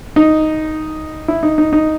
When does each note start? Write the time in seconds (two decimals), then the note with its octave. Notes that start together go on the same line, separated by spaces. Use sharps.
0.16 D#4
1.28 E4
1.43 D#4
1.58 D#4
1.73 D#4